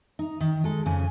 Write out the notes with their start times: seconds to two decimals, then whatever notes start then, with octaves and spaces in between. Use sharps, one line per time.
0.19 D#4
0.40 D#3
0.64 G#3 A4
0.85 F2 C#3 G#5